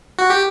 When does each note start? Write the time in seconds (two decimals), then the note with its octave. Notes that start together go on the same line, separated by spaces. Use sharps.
0.19 F#4
0.30 G4